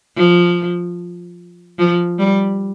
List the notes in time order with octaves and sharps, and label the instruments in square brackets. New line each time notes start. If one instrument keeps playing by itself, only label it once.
[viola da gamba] F3
F3
G3